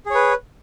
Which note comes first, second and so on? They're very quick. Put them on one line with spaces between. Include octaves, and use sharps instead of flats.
G#4 C#5 B4